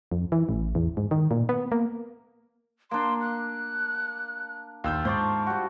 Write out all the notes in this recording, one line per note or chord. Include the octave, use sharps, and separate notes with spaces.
F2
E3
A1
E2
G#2
D#3
A#2
B3
A#3
A#3 D4 C6
F#6
D#2 F4 E6 G6
G#2 C5 D5 A5 C#6
G3 F#4